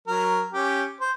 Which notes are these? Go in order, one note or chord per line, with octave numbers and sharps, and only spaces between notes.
F#3 A#4
C#4 G4
C5